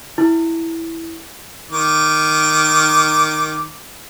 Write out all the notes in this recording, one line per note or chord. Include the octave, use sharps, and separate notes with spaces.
E4
D#3 D6